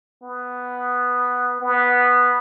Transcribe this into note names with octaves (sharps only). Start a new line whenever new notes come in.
B3
B3